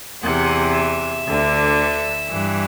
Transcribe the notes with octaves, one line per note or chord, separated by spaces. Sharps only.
E2 C3 E3 F#5
E5
D2 D3
G2 E3